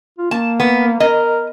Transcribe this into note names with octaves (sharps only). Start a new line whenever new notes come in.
F4
A#3 A5
B3
A#4 D#5